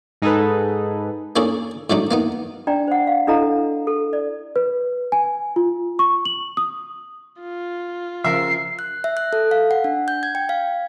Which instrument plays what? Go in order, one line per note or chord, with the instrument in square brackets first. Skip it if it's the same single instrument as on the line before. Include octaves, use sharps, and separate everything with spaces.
[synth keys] G#2 D#4 G#4 A4 B4
[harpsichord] A#3 C#4 D4 G#4 A4
G#2 F#3 A3 D4 D#4
A#3 B3 D#4
[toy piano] D4 D5 G5 A#5
C5 F#5
F5
D4 E4 A4 D#5 F5 A#5
A4
D5
[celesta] B4
G#5
F4
C#6
F#7
D#6
[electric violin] F4
[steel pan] C#3 F3 [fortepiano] A#4 E5 [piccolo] C7
[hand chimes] F#6
E5
F#6
A4
F5
F#5
D4
G6
G#6
G5
F5